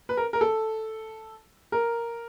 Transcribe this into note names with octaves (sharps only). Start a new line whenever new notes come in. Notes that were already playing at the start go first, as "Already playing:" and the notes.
B4
A#4
A#4
A4
A#4